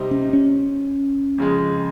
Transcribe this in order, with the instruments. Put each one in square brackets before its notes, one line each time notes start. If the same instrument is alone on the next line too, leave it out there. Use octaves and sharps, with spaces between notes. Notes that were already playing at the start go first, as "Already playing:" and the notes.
Already playing: [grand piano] C3 G3 C4 D#4
[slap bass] C#4
C#4
[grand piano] F2 C#3 G#3